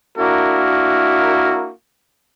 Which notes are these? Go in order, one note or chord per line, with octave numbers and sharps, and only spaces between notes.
A#3 D4 E4 F#4 A#4